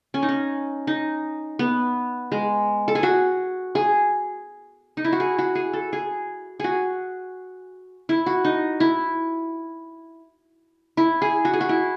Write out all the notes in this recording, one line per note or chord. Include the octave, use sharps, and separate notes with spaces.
C#4
D#4
C#4
D#4
B3
G#3
A4
G#4
F#4
G#4
D#4
E4
F#4
G#4
F#4
G#4
A4
G#4
F#4 G#4
E4
F#4
D#4
E4
E4
G#4
F#4
G#4
F#4
E4